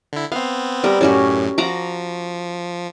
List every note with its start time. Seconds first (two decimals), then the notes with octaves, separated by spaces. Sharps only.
0.13 D3 E4
0.32 B3 C4 F5
0.84 G3 A#4
1.01 F#2 A2 C#4 F#4 G4
1.58 F3 F#4 A#5 D6